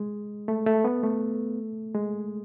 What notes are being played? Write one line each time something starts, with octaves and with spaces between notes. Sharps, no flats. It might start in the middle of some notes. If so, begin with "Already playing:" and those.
Already playing: G#3
A3
A3
B3
A3
G#3